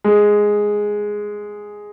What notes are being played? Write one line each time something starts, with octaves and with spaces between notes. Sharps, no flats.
G#3